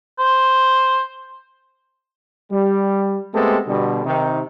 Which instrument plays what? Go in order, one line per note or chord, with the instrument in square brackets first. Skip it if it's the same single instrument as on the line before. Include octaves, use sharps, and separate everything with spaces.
[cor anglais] C5
[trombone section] G3
G#3 A3 B3 C4 G4 A4
B2 D3 G3
C3 D#3 D#4